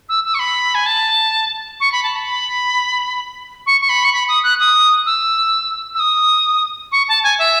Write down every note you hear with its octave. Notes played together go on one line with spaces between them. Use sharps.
E6
E6
C#6
B5
G#5
A5
C#6
B5
A5
B5
C#6
C#6
B5
C#6
B5
D#6
F#6
D#6
E6
E6
D#6
C#6
A5
G#5
E5